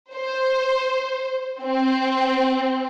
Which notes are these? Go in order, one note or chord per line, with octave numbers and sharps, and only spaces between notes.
C5
C4